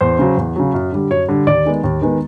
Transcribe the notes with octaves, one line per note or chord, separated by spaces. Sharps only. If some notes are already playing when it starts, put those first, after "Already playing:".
E2 C5
C#3 F#3
E2
C#3 F#3
F#2
D3 G3
F#2 C#5
D3 G3
D#2 D5
D#3 G#3 B3
D#2
D#3 G#3 B3